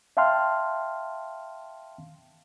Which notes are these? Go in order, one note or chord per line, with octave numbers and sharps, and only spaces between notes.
E5 F5 G5 A5 C6 F6